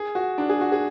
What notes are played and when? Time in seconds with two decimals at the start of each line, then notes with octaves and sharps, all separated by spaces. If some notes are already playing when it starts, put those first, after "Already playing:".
Already playing: G#4
0.15 F#4
0.38 D4
0.49 G#4
0.61 F#4
0.72 G#4